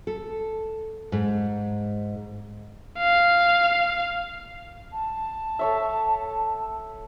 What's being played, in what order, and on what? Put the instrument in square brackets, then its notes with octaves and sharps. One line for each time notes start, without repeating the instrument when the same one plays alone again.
[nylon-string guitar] A4
G#2
[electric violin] F5
[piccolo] A5
[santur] A4 C#5 E5